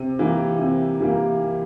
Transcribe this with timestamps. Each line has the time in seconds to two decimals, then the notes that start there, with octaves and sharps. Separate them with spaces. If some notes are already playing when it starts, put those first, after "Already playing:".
Already playing: C3
0.19 E3 G3 A#3
0.59 C3
1.00 E3 G3 A#3